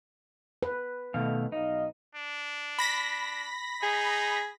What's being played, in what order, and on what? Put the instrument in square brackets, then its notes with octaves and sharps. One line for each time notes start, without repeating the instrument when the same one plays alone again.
[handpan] B4
[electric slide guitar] B2 D#3 F5 [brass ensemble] A3
[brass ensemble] B1 D#5 F5 [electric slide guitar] D#4
[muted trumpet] D4
[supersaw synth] B5 A#6 B6
[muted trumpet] D#4 [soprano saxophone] G#4